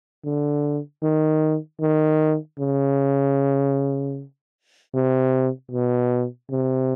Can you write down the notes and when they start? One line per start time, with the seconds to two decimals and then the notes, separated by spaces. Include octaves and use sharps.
0.24 D3
1.02 D#3
1.81 D#3
2.59 C#3
4.94 C3
5.71 B2
6.51 C3